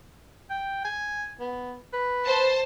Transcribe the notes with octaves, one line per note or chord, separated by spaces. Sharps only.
G5
G#5
B3
B4
C5 A5